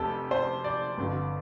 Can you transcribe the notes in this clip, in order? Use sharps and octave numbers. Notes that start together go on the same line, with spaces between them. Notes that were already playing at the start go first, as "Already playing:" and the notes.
Already playing: F1 F2 C3 G4 A4
C5
D5
G1 F2 D3